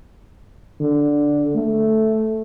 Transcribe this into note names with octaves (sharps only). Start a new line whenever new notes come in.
D3
A3